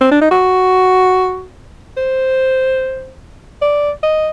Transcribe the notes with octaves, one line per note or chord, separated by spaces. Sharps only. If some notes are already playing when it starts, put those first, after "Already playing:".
C4
D4
D#4
F#4
C5
D5
D#5